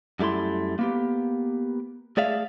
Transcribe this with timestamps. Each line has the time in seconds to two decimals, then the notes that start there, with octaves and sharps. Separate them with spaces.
0.19 F#2 G3 A3 E4 C6
0.79 A#3 B3 G4
2.17 A3 G#4 D5 E5 F5